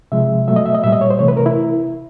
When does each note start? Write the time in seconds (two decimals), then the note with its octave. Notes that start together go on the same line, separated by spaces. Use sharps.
0.12 C3 F3 G#3 E5
0.48 B2 F#3 A3 E5
0.56 D#5
0.66 E5
0.74 D#5
0.84 A#2 G3 E5
0.92 D#5
1.01 C#5
1.10 C5
1.19 C3 E3 A3 C#5
1.28 B4
1.37 A#4
1.46 E4